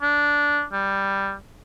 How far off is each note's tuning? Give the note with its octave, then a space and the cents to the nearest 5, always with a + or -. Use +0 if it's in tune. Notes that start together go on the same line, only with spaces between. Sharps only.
D4 -10
G3 +5